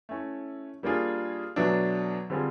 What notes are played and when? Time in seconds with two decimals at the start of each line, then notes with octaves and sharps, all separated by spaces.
0.09 A3 C#4 E4
0.83 G3 A#3 D4 F4 G#4
1.56 B2 F#3 A3 D4
2.30 D3 G3 C4 F4 G#4